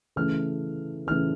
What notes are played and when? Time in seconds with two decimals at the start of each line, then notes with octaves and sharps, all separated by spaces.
0.16 C#3 E3 A3 F6
1.07 C#3 E3 A3 F6